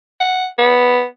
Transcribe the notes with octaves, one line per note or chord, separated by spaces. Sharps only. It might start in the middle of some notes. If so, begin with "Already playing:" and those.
F#5
B3